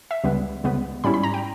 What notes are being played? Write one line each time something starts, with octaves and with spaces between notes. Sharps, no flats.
E5
C#2 C#3 G3 B3
C#2 C#3 G3 B3
G#2 G3 C#4 E4 B5
B5
A#5
G5